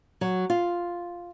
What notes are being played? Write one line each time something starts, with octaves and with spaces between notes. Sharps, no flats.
F#3
F4